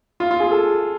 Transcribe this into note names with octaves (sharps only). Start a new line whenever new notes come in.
F4
F4
G#4
A4